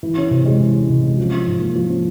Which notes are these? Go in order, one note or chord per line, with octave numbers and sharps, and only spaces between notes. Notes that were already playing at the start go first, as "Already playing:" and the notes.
E3
C#4
C3
G#3
E3
C#4
C3
G#3
F3
C#4
G#2
A#3
F3
C#4